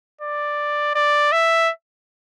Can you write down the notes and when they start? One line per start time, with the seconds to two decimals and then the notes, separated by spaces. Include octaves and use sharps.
0.21 D5
0.95 D5
1.32 E5